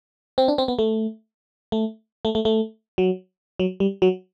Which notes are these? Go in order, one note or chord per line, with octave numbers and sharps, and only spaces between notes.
C4
D4
C4
B3
A3
A3
A3
A3
A3
F#3
F#3
G3
F#3